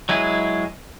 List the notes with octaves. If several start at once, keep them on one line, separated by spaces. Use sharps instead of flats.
F#3 G#3 E4 G#4